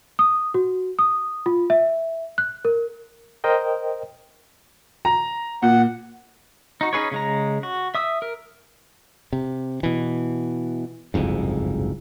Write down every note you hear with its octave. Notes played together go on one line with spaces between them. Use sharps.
D#6
F#4
D#6
F4
E5
F#6
A#4
A#4 C5 D#5 G5
A#5
A#2 F#5
D#4 F#4
C#4 D#4 G#4 B4 C#5
C#3 G#3 A#5
F#4
E5 D#6 E6
A#4
C3
B2 E3
F#1 C2 F2 G#2